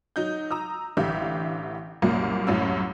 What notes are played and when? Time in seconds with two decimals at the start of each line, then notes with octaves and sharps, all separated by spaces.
0.16 F#3 D#4 G6
0.51 A#5 D#6 E6
0.97 A1 D3 G4 E5 F5 G6
2.02 C2 F#2 A#2 F#3 A#3
2.47 C2 F#2 A2 C#4 E6